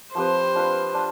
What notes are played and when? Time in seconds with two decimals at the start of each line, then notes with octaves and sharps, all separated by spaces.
0.15 F3 C4 G4 B4 C5
0.55 D4 F4 B4
0.95 D4 F4